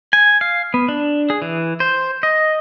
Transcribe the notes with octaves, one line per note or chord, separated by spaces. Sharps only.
G#5
F5
B3
D4
G#4
E3
C5
D#5